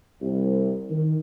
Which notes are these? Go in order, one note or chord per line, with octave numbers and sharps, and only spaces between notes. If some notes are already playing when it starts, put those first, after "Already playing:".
C2
D#3